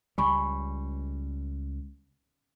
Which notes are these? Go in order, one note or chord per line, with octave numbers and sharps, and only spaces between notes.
C#2 G3 G#5 B5 C#6